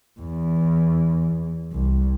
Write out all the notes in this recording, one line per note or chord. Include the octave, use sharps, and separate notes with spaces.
E2
C2